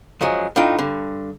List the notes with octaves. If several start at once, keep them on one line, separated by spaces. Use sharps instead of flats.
F#2 F3 F#3 G#3
A2 D4 D#4 F4 G5
G2 D3